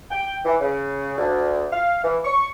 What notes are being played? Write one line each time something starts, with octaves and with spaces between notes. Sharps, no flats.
G5
E3
C#3
D2
F5
E3
C#6